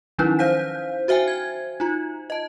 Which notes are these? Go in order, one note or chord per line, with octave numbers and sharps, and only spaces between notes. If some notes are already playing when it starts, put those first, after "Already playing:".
D#3 F3 F#3 C#4 D#4 E4
C5 F5 G6 B6
F#4 C5 E5 G5 G#5
G#6
D#4 F4
D#5 A5